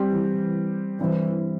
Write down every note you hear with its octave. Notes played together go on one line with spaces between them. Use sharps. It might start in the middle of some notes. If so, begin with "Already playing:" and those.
Already playing: G3 C4 G4
E3
G2 E3 G3 C4 E4 C5